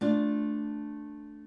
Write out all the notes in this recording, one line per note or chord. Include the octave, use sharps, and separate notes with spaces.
A3 D4 F4